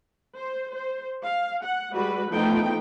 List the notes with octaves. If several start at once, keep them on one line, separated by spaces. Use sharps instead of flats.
C5
C5
F5
F#5
G3 G#3 F#4 B4
E3 F3 A3 B3 D#4 G5